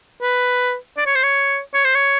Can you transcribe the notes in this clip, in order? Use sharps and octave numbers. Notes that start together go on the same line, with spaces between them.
B4
D5
C#5
C5
C#5
C#5
C5
C#5